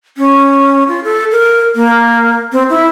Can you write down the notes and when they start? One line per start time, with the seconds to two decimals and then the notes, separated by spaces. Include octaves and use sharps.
0.17 C#4
0.88 F4
1.04 A4
1.32 A#4
1.76 A#3
2.52 C4
2.70 E4